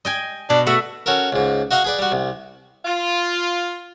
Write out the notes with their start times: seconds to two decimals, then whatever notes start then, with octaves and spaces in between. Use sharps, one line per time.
0.05 D#5 G5 G#5
0.50 B2 D4
0.67 A3 F#4 E5
1.06 C#4 F#4 A4 A#4
1.32 C#2 G#2
1.71 F#4 D#5 F5 F#5 C#6
1.85 G#4 B4 D5
1.99 G3 F#4
2.12 C2
2.85 F4